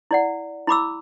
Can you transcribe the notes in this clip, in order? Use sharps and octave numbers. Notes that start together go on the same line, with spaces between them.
E4 D5 F#5
E4 B5 D6 E6